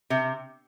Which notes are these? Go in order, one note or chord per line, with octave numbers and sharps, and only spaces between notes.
C3